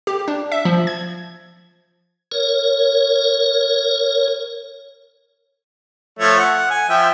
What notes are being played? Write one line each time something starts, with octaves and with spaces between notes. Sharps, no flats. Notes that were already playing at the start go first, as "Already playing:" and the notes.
G4
D4
E5
F3
G#6
A#4 C#5
F3 A3 C#5
F#5
G#5
F3 E5 G5